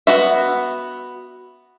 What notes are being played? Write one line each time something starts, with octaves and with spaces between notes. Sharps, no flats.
B3 F#4 E5